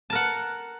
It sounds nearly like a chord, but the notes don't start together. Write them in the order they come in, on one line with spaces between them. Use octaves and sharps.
A5 A#4 F#5